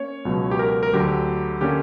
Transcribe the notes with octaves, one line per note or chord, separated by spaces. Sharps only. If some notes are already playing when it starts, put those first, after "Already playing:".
Already playing: A#3 C#4 C#5
C#2 B2 F#3
G4
A#4
A#4
D2 D3 F#3 G4
D3 A#3 C#4 G4